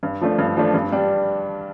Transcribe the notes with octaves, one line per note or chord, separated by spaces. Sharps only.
G2
F3 A3 D4
G2
F3 A3 D4
G2
G3 D4